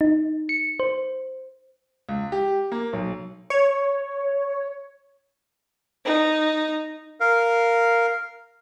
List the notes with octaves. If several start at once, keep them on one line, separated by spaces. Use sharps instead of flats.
D#4
C#7
C5
C#2
G4
A#3
B1
C#5
D#4
A#4 F5